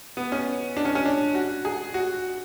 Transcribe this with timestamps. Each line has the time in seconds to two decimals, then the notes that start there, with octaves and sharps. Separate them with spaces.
0.17 B3
0.32 C#4
0.77 D4
0.85 C#4
0.95 C#4
1.06 D4
1.35 F#4
1.65 G#4
1.94 F#4